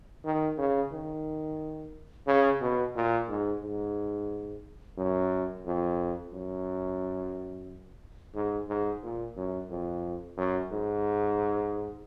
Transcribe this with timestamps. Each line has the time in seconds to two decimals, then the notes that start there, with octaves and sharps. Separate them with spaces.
0.25 D#3
0.58 C#3
0.92 D#3
2.27 C#3
2.61 B2
2.95 A#2
3.29 G#2
3.63 G#2
4.98 F#2
5.66 F2
6.33 F#2
8.35 G#2
8.68 G#2
9.03 A#2
9.37 F#2
9.70 F2
10.37 F#2
10.72 G#2